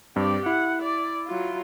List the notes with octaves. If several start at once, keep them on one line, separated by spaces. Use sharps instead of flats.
G2 C4 G4 D5
E4 F#5
D5
F#3 F4